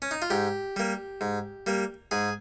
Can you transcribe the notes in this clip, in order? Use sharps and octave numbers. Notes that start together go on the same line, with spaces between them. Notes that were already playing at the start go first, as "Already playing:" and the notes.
C#4
D#4
F4
G#2 G4
G3 A#3
G#2
G3 A#3
G#2 G#4